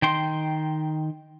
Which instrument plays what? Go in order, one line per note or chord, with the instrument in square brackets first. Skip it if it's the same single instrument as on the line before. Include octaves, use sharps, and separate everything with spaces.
[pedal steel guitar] D#3 G5 C6